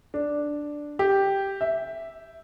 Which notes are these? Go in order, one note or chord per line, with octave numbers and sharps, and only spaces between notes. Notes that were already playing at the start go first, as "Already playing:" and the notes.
D4
G4
E5